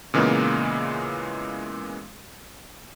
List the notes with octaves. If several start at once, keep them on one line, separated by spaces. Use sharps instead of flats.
A#2 C#3 E3 G#3 A#3 B3